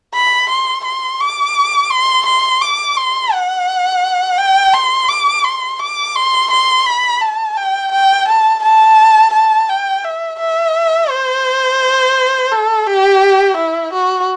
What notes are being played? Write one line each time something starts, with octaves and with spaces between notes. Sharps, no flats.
B5
C6
C6
D6
C6
C6
D6
C6
F#5
G5
C6
D6
C6
D6
C6
C6
B5
A5
G5
G5
A5
A5
A5
G5
E5
E5
C5
A4
G4
E4
F#4